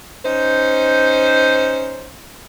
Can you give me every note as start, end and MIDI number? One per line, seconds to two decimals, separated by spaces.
0.25 2.15 61
0.25 2.15 63
0.25 2.15 72